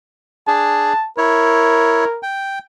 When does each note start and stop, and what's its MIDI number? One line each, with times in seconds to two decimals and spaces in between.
0.48 0.93 62
0.48 0.93 68
0.48 1.08 81
1.18 2.05 64
1.18 2.20 70
1.18 2.05 73
2.23 2.59 79